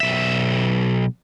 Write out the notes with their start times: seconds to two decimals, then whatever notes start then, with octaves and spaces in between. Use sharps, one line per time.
0.01 B1 E5